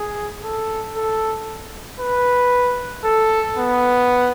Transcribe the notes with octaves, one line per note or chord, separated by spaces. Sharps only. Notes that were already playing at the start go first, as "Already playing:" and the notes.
Already playing: G#4
A4
A4
B4
A4
B3